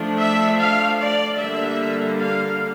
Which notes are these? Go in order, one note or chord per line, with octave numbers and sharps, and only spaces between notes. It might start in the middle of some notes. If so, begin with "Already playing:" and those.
Already playing: F3 A3 D4
E5
F5
D5
D3 G3 A#3 E5
F5